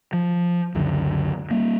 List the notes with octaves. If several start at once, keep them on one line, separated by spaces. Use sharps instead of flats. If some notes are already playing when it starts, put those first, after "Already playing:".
F3
C#2 F#2 D3
G3 A#3